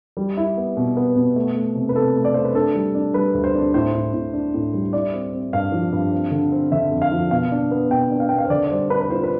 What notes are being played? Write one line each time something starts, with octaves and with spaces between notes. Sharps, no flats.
G3
E4
B3
B2
B3
B2
A3
A3
C3
B4
C3 A4
A3
D5
A3 C5
B4
D4 A4
G3
D4
G3 B4
D2
C5
D4
A2 C5
A2
A2
D4
A2
G3
E4 D5
C4
C4
G2 F5
F3
G2
C4
D3
C4
D3 E5
F2
F5
F3
B2 F5
D4
B3
B2 G5
D4
F5
B2 G5
F5
C5
D3 D5
D5
G3 C5
D4 B4
B4
F4 C5
B4